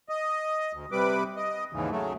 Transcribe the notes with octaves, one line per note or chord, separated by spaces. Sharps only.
D#5
D2
C3 G3 B4 D6
D#5
D#2 G#2 C#3 E3
C#3 F#3 A3